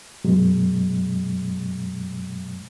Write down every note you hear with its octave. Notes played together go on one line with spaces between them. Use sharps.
F#2 B2 F#3 G#3